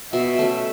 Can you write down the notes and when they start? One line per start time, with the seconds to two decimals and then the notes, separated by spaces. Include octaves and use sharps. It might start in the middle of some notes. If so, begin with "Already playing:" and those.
0.13 B2 E5
0.39 A3 C#4